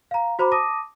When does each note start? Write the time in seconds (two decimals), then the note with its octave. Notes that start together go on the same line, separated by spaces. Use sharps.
0.11 F5 A#5
0.39 F#4 C5 A#5 B5 D6
0.52 A5 D6 D#6 A#6 D#7